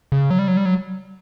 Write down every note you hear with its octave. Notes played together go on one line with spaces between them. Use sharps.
C#3
F#3
G3
F#3
G3
F#3